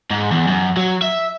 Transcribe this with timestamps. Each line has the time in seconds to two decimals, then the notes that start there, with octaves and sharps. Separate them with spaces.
0.10 G#2
0.31 E2
0.48 F#2
0.77 F#3
1.02 E5